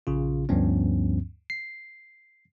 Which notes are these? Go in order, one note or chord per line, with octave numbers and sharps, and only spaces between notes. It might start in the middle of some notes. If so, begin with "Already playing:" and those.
A#1 C#3 F4
D2 G2 F3 B3 C#4
C7